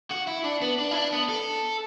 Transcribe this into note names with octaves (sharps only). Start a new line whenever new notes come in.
F#4
E4
D4
B3
D4
E4
D4
B3
A4